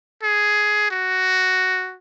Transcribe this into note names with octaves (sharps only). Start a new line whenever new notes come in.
G#4
F#4